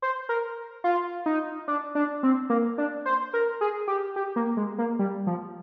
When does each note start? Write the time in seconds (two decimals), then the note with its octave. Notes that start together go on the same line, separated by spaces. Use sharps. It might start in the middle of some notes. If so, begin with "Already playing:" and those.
0.02 C5
0.29 A#4
0.84 F4
1.26 D#4
1.68 D4
1.95 D4
2.23 C4
2.50 A#3
2.78 D4
3.06 C5
3.33 A#4
3.61 G#4
3.88 G4
4.16 G4
4.36 A#3
4.57 G#3
4.78 A#3
4.99 G3
5.27 F3